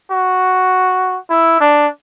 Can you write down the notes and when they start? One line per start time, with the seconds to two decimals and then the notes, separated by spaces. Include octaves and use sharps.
0.11 F#4
1.30 E4
1.60 D4